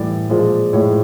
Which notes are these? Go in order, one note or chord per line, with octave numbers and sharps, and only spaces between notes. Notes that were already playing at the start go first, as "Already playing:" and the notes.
Already playing: A2 E3 G3 D5
A#2 F3 G#3
A2 F3 G#3 C#5